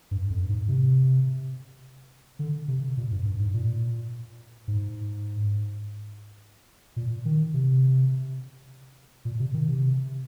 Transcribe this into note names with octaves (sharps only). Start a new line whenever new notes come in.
G2
F2
G#2
C3
D3
C3
A#2
G2
G2
G#2
A#2
G#2
A#2
D#3
C3
A#2
C3
D#3
C3